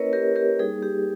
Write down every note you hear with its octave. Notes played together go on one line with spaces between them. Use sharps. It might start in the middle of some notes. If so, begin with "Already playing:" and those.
Already playing: A#3 C#4 E4 A#4 B4 C#5 D#5
G4 A#4
G4 A#4
G3 A#3 D#4 G#4
G4